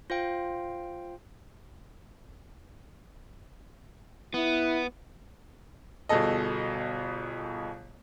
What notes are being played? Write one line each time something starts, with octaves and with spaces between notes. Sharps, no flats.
F4 C5 F5 G5
B3 E4
G1 B2 G#4 A4 D#5